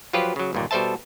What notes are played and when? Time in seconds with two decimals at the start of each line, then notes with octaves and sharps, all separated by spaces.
0.13 F3 F#3 F4 G4 B4
0.36 C#3 F#3
0.53 G1 D#2 A#2
0.71 B2 G3 A4 C5 E5 A5